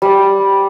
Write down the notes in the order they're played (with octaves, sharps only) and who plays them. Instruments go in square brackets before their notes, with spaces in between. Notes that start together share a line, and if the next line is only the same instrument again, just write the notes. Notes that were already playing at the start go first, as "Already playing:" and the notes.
[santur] G3